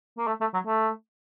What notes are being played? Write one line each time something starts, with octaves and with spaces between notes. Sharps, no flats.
A#3
A3
A3
F#3
A3